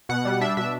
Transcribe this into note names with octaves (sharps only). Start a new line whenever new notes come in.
B2 F#5
G3
D4 E5
B2 E5